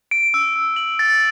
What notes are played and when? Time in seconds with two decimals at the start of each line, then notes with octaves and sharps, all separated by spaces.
0.11 D7
0.34 E6
0.56 E6
0.76 F#7
0.99 A6